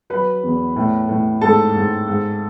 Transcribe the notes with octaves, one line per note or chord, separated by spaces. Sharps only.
F#3 B4 B5
E2
A2
A2
G#2 A4 A5
G#2
G#2